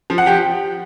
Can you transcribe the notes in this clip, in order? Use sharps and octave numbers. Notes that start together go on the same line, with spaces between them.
F3
F#5
F3 G4 G5